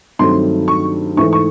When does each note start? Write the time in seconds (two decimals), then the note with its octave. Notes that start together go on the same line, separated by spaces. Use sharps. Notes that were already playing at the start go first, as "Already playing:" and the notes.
0.19 G2 D#3 F#3 A3 C4 C6
0.68 C#6
1.17 G#2 E3 A3 C#6
1.33 C#6